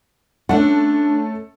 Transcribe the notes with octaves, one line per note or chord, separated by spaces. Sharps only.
A3 C#4 D4 A4 F#5